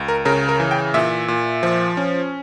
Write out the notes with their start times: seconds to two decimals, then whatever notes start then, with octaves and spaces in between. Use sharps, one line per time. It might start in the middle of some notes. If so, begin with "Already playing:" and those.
Already playing: C#2
0.08 A#4
0.25 C#3 A#4
0.49 A#4
0.60 E3
0.71 G5
0.94 A#2 E5
1.28 A#2
1.63 F3
1.97 C#4